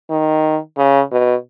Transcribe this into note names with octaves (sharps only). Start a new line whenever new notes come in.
D#3
C#3
B2